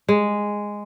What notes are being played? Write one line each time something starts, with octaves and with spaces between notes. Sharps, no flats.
G#3